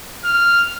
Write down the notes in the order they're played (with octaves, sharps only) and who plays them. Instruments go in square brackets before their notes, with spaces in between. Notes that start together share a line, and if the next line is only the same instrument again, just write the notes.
[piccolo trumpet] F6